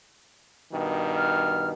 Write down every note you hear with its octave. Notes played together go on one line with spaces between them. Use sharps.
G2 B2 D#3
F6